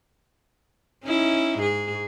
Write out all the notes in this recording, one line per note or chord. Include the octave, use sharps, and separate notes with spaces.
C#4 D#4 E4
G#2 G#4